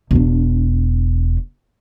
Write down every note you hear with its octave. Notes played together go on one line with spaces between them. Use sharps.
E1 D4